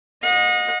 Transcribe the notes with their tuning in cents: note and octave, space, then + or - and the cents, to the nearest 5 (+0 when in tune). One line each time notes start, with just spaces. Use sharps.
D#5 -5 F#5 -40